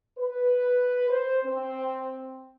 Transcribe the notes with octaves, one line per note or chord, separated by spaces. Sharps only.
B4
C5
C4